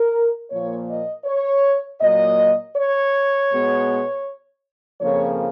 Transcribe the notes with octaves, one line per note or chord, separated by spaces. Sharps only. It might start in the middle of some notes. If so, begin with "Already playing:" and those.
Already playing: A#4
A#2 F3 A#3 C#5
D#5
C#5
A#2 F#3 A#3 D#5
C#5
B2 G#3 B3
F2 C#3 F3 A#3 C#5